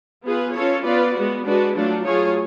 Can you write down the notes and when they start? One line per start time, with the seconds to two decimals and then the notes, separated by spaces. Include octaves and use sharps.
0.23 B3 F4 G#4 B4
0.54 C#4 F4 A4 C#5
0.84 B3 F4 B4 D5
1.14 G#3 B3 F#4
1.44 G#3 D4 F#4 B4
1.75 F#3 A3 D4 F4
2.04 F#3 A3 F4 G#4 C#5